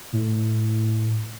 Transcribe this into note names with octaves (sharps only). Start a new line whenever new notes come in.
A2